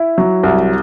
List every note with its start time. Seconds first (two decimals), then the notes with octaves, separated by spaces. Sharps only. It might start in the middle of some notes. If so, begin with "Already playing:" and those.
Already playing: E4
0.18 F#3
0.43 C2